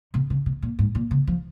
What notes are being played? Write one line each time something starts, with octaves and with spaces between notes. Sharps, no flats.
C3
C#3
C3
A#2
G#2
A#2
C#3
F3